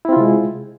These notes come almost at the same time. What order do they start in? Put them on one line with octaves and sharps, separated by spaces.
E4 C4 F4 C3 G#3